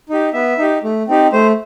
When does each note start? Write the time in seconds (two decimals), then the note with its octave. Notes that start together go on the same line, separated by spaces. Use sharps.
0.10 D#4 G4
0.33 B3 E5
0.58 D#4 G4
0.83 A3
1.08 C4 D#4 G4
1.32 A3 C5